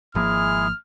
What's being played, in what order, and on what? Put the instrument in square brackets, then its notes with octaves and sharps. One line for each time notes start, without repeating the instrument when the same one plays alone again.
[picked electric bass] G#1 F3 A#3 [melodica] G#3 E4 G#4 [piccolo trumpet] F6